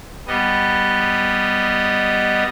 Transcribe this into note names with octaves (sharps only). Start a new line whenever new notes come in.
G3 B3 D#5